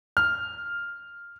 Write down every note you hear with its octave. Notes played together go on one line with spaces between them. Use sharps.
F6